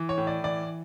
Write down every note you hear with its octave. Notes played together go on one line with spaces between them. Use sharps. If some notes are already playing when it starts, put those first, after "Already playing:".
Already playing: E3
C#5
A2
D5
E3 D5